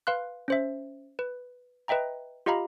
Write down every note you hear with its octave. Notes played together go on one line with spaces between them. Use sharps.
B4 F5 C6 F#6
C#4 C5 E5
B4
B4 D#5 E5 G5 A#5
F4 G4 D#5 F5 A#5 B5